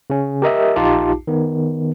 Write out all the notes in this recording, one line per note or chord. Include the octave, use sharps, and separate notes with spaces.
C#3 C#4
G4 A#4 D#5 E5
A#1 D#4 F4 G4 A5 D6
D#3 B3